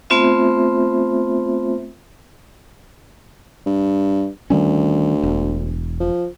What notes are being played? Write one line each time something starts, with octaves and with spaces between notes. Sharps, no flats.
A3 B3 C4 F4 C5 E5
G2
D2 D#3 G3 C#4
E1
F3